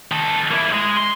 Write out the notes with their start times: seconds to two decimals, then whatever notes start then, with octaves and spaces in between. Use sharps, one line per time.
0.12 D#3 A4
0.51 A#3 E4
0.73 G#3
0.97 C6